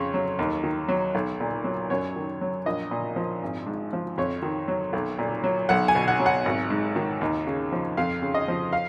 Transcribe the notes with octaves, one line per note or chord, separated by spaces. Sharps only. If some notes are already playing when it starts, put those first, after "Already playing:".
Already playing: F2 C#3 C#5
F#3
D#2
D#3
F#3
B1
A#2
F#3
F#2 C#5
D#3
F#3
A#1 D#5
A#2
F3
G#1
G#2
F3
F2 C#5
D#3
F#3
B1
A#2
F#3
B1 F#5
G#5
B2
F#5
F#3
F#5
G#1
G#2
D#3
D#2
C#3
F3
F2 F5
C#3
D#5
F3
F5